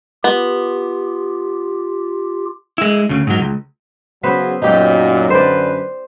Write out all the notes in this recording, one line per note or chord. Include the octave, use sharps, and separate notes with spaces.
B3 F4 G4
G#3 E4
D2 C#3
G#2 F#3
C#2
C#3 F#3 B3 B4 C5
F#2 A#2 F#3 D#4 G4
F#2 D3 B4 C5 D5